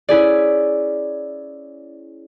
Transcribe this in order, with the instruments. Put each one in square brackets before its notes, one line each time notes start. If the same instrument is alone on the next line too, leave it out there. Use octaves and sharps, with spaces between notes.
[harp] C#4 E4 G#4 D5